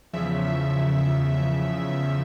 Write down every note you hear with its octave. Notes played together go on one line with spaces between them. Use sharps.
E2 C#3 F3 E5